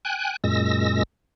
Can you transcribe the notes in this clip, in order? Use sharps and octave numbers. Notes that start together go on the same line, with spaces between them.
G5 G#5 F#6
F#2 A#2 G#3 E6 A#6